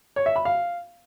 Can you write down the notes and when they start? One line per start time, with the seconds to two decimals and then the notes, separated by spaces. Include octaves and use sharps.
0.16 C#5
0.26 E5
0.36 B5
0.45 F5